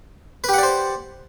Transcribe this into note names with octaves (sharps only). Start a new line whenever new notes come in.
G4 B4 C5 D5 F#5